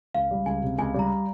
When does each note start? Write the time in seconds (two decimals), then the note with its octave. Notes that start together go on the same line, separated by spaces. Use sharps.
0.14 C#2 F5
0.31 G3
0.46 C#2 G#5
0.62 C3
0.78 C#2 G#5
0.94 G3 A#5